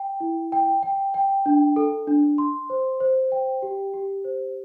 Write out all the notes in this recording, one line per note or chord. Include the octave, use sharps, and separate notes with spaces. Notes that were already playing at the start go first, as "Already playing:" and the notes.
Already playing: G5
E4
G5
G5
G5
D4
A4
D4
C6
C5
C5
G5
G4
G4
C5